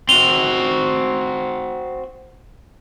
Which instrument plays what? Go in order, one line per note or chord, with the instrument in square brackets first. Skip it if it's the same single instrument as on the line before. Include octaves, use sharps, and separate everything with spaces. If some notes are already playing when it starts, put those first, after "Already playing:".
[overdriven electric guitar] C4 F#4 [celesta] F7 G7